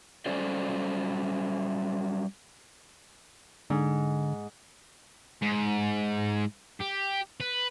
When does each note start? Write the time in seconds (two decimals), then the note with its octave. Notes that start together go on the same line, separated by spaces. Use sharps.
0.26 F#3 G3 C#4 A4 C5 D5
3.70 G#2 D3
5.42 G#2
6.80 G4
7.40 B4